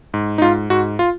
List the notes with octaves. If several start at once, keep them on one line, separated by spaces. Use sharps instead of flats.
G#2
D#4
G#2 F4
G#2 F#4
F4